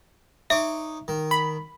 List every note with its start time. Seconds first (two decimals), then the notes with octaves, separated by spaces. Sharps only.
0.50 D#4 C#5 E5 D6
1.08 D#3
1.31 B5